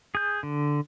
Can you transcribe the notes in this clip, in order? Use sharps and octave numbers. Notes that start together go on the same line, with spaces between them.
G#4 G6
D3